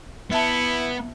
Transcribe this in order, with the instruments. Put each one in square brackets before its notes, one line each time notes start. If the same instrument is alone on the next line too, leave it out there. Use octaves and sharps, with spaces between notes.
[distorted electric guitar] B3 [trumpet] E4 [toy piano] E5 A5